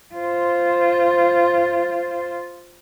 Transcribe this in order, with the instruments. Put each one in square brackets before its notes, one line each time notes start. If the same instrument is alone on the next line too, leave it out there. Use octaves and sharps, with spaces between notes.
[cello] F4 C5